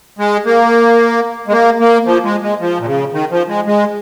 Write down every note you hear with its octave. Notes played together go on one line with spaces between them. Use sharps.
G#3
A#3
G#3
A#3
A#3
F3
G#3
G#3
F3
A#2
C#3
D#3
F3
G#3
G#3